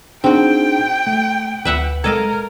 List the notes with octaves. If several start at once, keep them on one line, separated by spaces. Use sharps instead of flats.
C4 D4 D#4 F#4 G#4 G5
A3
D2 B4 E5 F#5
G#3 A4 A#4 D#5 F5 A#5 G#6